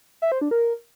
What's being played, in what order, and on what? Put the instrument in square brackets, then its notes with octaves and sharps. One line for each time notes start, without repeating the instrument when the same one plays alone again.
[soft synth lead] E5
C5
D4
A#4